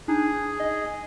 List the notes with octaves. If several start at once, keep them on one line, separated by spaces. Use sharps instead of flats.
D4 D#4 G#4
D#5